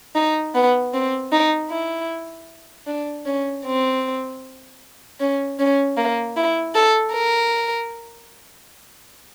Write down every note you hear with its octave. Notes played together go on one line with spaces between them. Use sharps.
D#4
B3
C4
D#4
E4
D4
C#4
C4
C#4
C#4
A#3
E4
A4
A#4